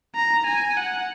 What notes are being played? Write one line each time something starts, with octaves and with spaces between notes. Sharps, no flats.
A#5
G#5
F#5